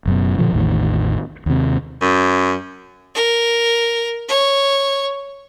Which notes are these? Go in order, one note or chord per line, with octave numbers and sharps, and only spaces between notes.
F#1 F#2 B2
A#2 D3 F3
A1 E2 A2 D#3
D#2 C3
F#2
A#4
C#5